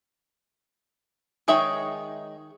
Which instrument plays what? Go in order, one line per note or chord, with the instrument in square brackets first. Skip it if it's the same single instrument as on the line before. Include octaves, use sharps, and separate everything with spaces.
[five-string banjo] D#3 G#4 E5 [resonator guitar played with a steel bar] G#3 D#4 C#5